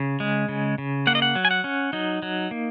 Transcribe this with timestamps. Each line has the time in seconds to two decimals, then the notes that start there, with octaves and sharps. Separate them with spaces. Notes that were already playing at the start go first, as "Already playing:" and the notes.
Already playing: C#3
0.20 G#3
0.49 C#3
0.78 C#3
1.07 A#3 F#5
1.15 D#5
1.22 F#5
1.35 F#3
1.45 G#5
1.51 F#5
1.64 C#4
1.93 F#3 D#4
2.22 F#3
2.51 A#3